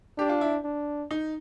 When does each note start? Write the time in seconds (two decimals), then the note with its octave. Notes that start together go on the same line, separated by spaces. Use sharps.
0.18 D4 G4
0.29 F4
0.41 E4
0.64 D4
1.11 D#4